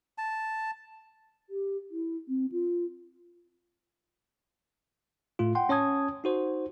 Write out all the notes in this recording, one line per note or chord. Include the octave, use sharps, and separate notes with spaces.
A5
G4
E4
C4
F4
A2 A3 F4
F#5 G5 C6
C#4 C#5 A5 D#6 G#6
D#4 F#4 C5